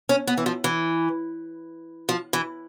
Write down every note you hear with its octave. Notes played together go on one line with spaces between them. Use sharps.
C#4
B3
E3
F3
E3
F3
E3